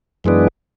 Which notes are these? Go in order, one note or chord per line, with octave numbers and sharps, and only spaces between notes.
F#2 E3 G#3 B3 D4